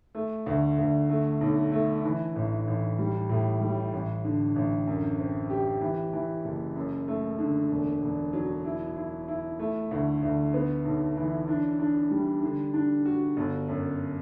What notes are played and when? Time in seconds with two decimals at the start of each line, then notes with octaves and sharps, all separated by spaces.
0.15 A3
0.46 D2
0.78 D2
1.10 A3
1.41 B1
1.72 A3
2.04 E3
2.36 A1
2.68 A1
2.99 G3
3.29 A2
3.61 G3
3.93 A1
4.24 D3
4.56 A1
4.87 F#2
5.19 C4
5.50 G4
5.82 E3
6.13 E3
6.45 F#1
6.76 F#2
7.08 A3
7.39 D3
7.70 E1
8.02 E1
8.33 F#3
8.65 E4
8.96 E4
9.28 E4
9.59 A3
9.91 D2
10.23 D2
10.54 B3
10.85 B1
11.17 E3
11.48 D4
11.79 D4
12.11 G3
12.43 D3
12.74 D4
13.06 F#4
13.37 G1
13.68 F#2